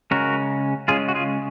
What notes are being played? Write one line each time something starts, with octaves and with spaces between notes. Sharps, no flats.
C#3 G#3 C#4 F#4 A#4
C#3 G#3 C#4 F4 G#4
F#4
F4 G#4